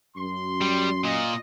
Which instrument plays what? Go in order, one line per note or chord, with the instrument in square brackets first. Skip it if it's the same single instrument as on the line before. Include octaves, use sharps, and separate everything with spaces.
[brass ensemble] F#2 [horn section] C6
[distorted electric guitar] G3
[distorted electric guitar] A#2 [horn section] D#5